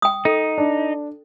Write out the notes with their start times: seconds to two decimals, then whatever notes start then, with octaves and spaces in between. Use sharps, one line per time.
0.02 G5 D#6
0.25 D#4 A4
0.58 D4